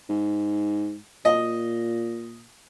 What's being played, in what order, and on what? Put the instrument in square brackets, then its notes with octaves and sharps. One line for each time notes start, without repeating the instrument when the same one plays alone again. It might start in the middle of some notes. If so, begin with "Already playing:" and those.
[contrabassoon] G#2
[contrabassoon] A#2 [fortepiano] D#5